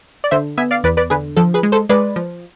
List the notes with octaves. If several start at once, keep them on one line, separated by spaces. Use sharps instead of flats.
D5
D3 C5 E5
B3 E5 G#5
D5 F5
E2 B4 D5
B4 D5
D3 G#4 B4
F3 A4
G#4 B4
G#3
A4 C5
G#3 B4 D5
F3